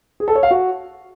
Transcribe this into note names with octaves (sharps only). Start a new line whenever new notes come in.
G#4
A4
C#5
F5
F#4